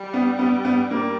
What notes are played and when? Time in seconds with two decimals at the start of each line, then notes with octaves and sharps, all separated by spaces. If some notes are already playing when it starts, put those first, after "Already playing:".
Already playing: G3
0.14 B3
0.39 B3
0.65 B3
0.91 A#3